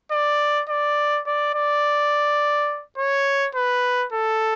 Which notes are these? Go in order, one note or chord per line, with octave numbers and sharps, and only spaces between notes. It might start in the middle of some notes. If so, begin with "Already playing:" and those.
D5
D5
D5
D5
C#5
B4
A4